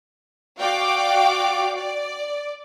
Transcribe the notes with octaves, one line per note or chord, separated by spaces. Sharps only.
F#4 D5 F5 G5 D6
D5